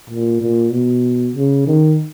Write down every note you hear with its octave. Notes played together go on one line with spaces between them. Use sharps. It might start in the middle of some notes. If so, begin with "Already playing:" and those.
A#2
A#2
B2
C#3
D#3